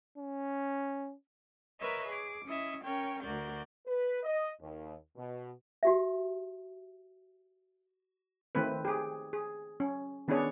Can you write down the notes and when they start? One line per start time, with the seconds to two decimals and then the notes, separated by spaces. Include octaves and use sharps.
0.18 C#4
1.79 A#4 B4 C#5 D#5 E5
2.08 G#4 D6
2.46 C#4 E4 D#5 E5
2.84 C#4 A#4 C#5 G5
3.22 D2 F#4 A#4 D5 G6
3.85 B4
4.23 D#5
4.60 D#2
5.16 B2
5.83 F#4 G4 E5
8.55 D#3 A3 C4 B4
8.85 G4 G#4
9.33 G#4
9.80 C#4
10.28 D#3 B3 C#4 D4 G#4 C#5